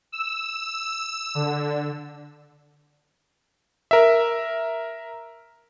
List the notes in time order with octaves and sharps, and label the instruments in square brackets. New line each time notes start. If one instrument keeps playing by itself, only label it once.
[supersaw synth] E6
D3
[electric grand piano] A#4 E5